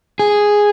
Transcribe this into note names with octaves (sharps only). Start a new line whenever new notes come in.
G#4